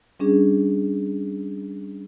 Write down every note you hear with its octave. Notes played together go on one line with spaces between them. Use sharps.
G3 C#4 D4 G#4